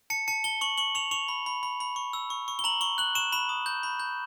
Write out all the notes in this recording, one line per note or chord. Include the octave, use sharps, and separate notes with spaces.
A5 C#7
A5 C#7
A5 G7
C#6 F#7
C#6 F#7
C#6 F7
C#6 F7
B5
B5
B5
B5
C#6
E6
C#6
C#6
G7
A#5 F#7
C#6 G7
F#6 F#7
C#6 E7
B5 E7
D#6
G6
B5
G6